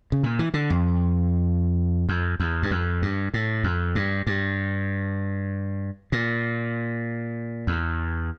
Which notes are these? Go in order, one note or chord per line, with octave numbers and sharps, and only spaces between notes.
C#3
A#2
E3
D3
F2
F2
E2
G2
F2
G2
A2
F2
G2
G2
A#2
E2